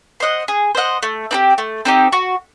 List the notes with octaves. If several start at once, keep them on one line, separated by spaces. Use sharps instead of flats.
C5 D#5 F#5
G#4
C5 D#5 F#5
A3
C4 D#4 G4
A3
C4 D#4 G4
F#4